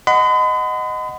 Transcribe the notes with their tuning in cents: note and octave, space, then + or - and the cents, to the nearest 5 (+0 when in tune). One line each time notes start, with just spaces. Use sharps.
D#5 +0 F#5 +0 B5 +45